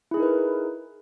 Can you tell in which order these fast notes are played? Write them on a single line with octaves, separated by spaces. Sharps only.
E4 G#4 D#4 A#4 B4